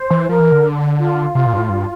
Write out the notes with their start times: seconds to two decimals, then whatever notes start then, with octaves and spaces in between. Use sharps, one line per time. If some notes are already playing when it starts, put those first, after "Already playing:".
Already playing: C5
0.10 E3
0.29 F3 A#4
0.40 E3
0.52 D3
0.99 F4
1.35 C3
1.46 A#2
1.53 G2
1.58 A2
1.69 G2